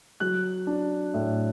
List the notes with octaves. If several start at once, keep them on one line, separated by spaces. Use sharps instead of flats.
F#3 F#6
D4
A2